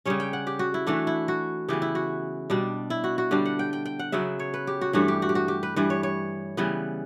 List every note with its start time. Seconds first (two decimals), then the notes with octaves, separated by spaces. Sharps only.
0.05 C#3 G3 C#4 C#5
0.20 G5
0.33 F#5
0.47 G4
0.59 F#4
0.74 E4
0.87 E3 A3 D4 F#4
1.07 E4
1.28 F#4
1.68 C#3 E3 B3 G4
1.82 E4
1.95 F#4
2.50 B2 G3 D4
2.90 E4
3.04 F#4
3.18 F#4
3.31 D3 G3 D4 G4
3.45 F#5
3.59 G5
3.73 G5
3.85 G5
3.99 F#5
4.12 C#3 F#3 B3 E5
4.39 C#5
4.54 B4
4.67 G4
4.81 F#4
4.93 G2 E3 A3 D4 F#4
5.08 G4
5.22 F#4
5.29 G4
5.35 F#4
5.48 G4
5.63 B4
5.76 G2 E3 G3 B4
5.90 C#5
6.03 C#5
6.57 C#3 E3 G3 B3